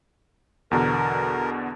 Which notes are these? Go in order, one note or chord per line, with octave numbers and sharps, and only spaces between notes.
E2 B2 D3 A#4